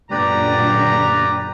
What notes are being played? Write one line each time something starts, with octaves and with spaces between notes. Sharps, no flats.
F#2 A#2 D3 G4 B4 D5 A#5